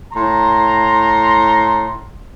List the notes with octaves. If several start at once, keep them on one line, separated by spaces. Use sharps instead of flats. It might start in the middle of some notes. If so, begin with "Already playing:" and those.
A2 A#5 C6